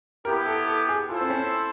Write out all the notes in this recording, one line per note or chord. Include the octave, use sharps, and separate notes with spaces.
B3 E4 G4 A#4
A4
A4
G#4
E4 F4 A4 C5
C4
C#4